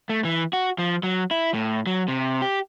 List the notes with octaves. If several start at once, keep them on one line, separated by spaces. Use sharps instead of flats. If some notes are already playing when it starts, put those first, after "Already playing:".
A3
E3
F#4
F3
F#3
E4
A2
F#3
C3
G4